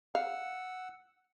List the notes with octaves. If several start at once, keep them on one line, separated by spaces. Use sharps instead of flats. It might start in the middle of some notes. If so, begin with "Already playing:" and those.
F5 F#5 E6